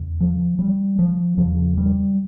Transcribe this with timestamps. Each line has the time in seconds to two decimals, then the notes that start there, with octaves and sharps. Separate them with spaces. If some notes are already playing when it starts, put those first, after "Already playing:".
Already playing: E2 C#3
0.20 F3
0.59 G3
0.99 F3
1.37 E2 C#3 F3
1.77 G3